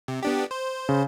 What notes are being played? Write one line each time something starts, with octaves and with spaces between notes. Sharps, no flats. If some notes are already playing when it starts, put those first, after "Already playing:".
C3
B3 D4 G4
C5
C#3